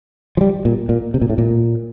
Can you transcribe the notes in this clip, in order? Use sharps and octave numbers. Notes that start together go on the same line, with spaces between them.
F3
G3
A#2
A#2
C3
A#2
A2
A#2